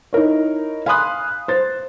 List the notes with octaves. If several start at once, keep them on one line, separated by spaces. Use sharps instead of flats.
D#4 E4 A#4 C#5
F5 G#5 B5 C6 D#6 F#6
C5 A6